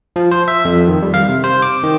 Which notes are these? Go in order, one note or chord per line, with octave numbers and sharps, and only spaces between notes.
F3
C5
E5
F2
D#3
G3
F5
C3
C5
D6
D#3